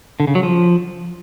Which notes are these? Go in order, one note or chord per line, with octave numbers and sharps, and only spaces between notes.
D3
C#3
F#3
F3